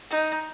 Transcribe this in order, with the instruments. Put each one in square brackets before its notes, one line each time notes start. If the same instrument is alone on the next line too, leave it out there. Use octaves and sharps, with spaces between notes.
[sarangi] D#4